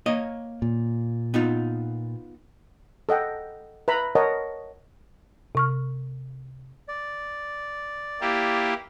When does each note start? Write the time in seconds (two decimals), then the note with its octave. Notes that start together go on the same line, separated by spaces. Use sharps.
0.06 A#3 C#5 D#5
0.62 A#2
1.34 B3 D#4 F4
3.09 A4 D#5 F#5 G5
3.88 B4 E5 A#5 B5
4.15 A#4 C#5 D#5 F#5 A5
5.55 C3 C#6 F6
6.88 D5
8.21 A#3 E4 G4